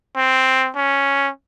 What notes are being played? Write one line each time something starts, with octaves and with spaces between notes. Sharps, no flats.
C4
C#4